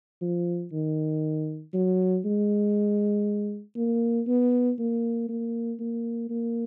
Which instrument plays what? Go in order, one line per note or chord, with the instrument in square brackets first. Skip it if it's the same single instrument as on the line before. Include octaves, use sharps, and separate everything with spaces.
[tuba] F3
D#3
F#3
G#3
A#3
B3
A#3
A#3
A#3
A#3